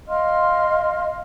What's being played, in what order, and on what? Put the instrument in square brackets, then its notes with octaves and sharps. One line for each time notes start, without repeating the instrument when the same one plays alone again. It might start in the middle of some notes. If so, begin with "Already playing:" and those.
[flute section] D#5 F5 C6 F6